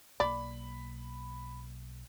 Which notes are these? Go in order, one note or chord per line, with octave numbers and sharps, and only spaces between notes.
B1 A#3 D5 B5